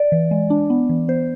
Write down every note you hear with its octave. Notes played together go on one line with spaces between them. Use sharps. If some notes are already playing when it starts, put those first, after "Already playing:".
Already playing: D5
E3
G#3
D4
B3
E3
B3 C5